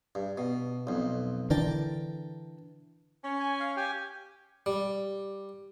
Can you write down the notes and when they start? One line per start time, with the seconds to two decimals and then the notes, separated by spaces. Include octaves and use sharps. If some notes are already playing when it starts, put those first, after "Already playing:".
0.15 G2
0.38 B2
0.87 B1 F2
1.50 D3 E3 D4 A#4 G5 A5
3.24 C#4
3.40 G#5
3.60 F5
3.77 G4 G5 G#5
4.66 G3